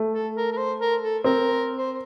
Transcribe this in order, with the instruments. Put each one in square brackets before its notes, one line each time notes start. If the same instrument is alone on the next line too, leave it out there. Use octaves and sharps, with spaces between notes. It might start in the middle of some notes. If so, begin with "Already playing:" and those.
Already playing: [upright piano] A3
[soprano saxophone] A4
A#4
A#4
C5
A#4
A4
[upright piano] C4 [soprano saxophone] A#4
[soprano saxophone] C5